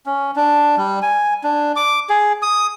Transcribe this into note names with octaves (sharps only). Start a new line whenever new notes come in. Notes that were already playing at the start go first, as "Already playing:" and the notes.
C#4
D4
G3
G#5
D4
D6
G#4
D#6